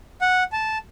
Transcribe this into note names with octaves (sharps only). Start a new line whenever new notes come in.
F#5
A5